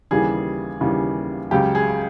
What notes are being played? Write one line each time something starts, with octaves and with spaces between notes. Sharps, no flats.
D#2 C#3 E3 G3 G#4
D#2 C#3 E3 G3
C#2 C#3 F#3 G4
G#4